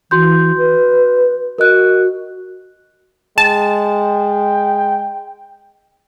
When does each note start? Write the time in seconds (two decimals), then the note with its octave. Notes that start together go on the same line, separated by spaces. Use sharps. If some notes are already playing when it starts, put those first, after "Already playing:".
0.11 E3 F#4 C6 G6
0.58 B4
1.58 F#4 A#4 D#5 F#6
3.38 G#3 G5 A5